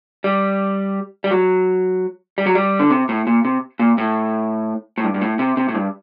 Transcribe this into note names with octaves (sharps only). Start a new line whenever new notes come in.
G3
G3
F#3
G3
F#3
G3
D3
C3
A2
A#2
C3
A#2
A2
A2
G2
G2
A2
C3
C3
A2
G2